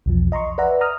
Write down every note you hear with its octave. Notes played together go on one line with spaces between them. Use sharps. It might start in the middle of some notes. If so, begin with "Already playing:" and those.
B1 E2 F3
D#5 A#5 C6 C#6
B4 D5 E5 F#5 A#5
A#5 D#6 F6